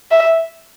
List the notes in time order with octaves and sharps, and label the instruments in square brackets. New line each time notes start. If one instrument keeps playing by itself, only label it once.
[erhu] E5